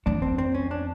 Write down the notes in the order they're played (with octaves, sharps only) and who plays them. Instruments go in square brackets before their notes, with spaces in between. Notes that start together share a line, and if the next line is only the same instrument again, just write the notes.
[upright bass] F2 [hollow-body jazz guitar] D4
[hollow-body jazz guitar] C4
C4
C#4
D4